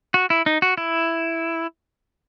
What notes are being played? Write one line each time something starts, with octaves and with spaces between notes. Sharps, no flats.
F#4
E4
D#4
F#4
E4